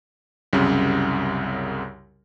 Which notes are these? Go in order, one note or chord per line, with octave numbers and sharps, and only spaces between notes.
C2 F#2 C#3 G3